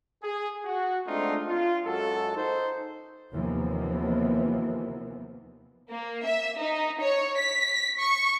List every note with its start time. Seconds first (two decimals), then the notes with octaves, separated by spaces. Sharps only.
0.23 G#4
0.65 F#4
1.08 G#3 A3 C4 D4 D#4 F4
1.48 F4
1.85 F#2 G#3 F#4 A4
2.36 D#4 C5
3.33 D#2 C3 E3 F3 A#3 B3
5.89 A#3
6.23 E5
6.59 D#4
7.00 C#5
7.39 B6
7.98 C#6